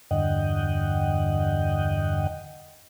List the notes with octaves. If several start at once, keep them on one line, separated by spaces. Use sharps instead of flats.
E2 G2 D3 D#5 F#5 G5